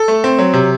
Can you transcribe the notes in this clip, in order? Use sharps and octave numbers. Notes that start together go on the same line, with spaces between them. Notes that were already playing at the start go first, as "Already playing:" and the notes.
Already playing: A4
A3
C4
F#3
C3